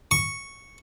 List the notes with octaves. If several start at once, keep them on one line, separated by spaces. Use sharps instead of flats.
C#6